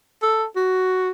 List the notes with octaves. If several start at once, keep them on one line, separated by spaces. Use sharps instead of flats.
A4
F#4